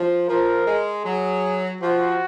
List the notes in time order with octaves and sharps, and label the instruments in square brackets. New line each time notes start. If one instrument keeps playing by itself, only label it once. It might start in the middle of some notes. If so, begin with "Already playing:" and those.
Already playing: [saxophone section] F3
[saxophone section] F3 [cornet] A#4
[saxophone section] G#3
[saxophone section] F#3 [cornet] G#4
[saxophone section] F3 [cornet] F#4